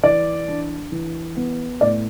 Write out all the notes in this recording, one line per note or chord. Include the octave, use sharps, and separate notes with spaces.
E3 D5
D4
E3
B3
A2 D5